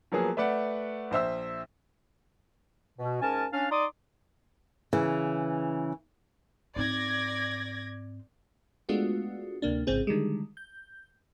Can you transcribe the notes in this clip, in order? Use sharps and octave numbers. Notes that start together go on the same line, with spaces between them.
F3 F#3 A#3 B3 G#4
A3 B4 D5 F#5
A#1 C5 E5 E6
B2
G#2 C#4 A#4 G#5 A5
C#4 D4 F5
D#4 D5 C6 D6 D#6
C#3 E3
G#2 C4 D5 G#6 A#6
G#3 A3 B3 D4 F4 F#4
D2 C3 A#3 D4
A1 G#2 C#3 C4 G#4
D3 D#3 G3 G#3
G6